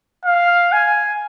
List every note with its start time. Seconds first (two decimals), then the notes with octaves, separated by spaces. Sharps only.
0.25 F5
0.72 G#5